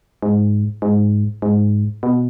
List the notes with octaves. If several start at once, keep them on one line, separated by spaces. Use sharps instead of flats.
G#2
G#2
G#2
B2